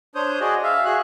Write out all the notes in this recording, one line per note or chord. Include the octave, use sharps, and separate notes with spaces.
D4 C5 C#5 D#6 G6
F#4 G#4 D5 D#5
E5 F5
F#4 G#4 F#6